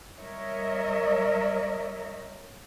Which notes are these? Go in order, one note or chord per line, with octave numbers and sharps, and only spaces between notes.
G3 A#4 C#5 D#5 E5